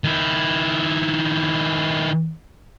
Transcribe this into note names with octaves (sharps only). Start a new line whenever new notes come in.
D#3 E4